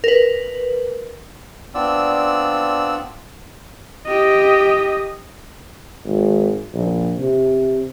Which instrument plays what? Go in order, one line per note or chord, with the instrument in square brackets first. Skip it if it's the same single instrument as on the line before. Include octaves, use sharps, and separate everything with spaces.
[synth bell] A#4 B4
[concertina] B3 C4 D4 F4 D5 E6
[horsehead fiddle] G4 D#5
[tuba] G#1
A#1
C3